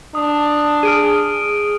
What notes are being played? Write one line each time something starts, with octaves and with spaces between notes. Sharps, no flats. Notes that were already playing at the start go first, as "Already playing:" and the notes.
D4 D#6
G#4 F6 D7 D#7